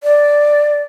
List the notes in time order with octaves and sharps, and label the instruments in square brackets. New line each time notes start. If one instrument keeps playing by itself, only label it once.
[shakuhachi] D5